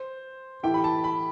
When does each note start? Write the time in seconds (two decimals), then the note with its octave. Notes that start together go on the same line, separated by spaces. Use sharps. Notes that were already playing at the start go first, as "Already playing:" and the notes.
Already playing: C5
0.63 A2 E3 A3 E4 G4 G5
0.74 B5
0.84 A5
1.04 B5